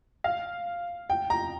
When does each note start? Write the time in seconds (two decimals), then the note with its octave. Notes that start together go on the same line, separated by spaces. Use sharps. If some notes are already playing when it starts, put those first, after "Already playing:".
0.24 F5
1.10 G5
1.30 A#5